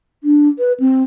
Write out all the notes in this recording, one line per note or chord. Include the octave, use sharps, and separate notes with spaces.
D4
B4
C4